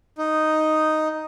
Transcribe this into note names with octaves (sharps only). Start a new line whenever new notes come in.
D#4